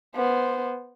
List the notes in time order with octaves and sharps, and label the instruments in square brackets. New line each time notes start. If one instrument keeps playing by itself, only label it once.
[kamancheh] B3 C5